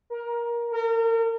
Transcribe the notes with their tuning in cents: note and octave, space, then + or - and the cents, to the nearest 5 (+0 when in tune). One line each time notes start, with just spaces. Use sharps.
A#4 +20
A#4 -35